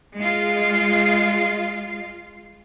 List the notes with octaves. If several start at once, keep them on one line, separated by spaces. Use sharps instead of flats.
G#3 F4